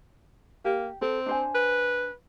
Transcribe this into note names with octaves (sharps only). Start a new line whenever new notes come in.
A#3 G4
C4 A4
D4 C5 G#5
B4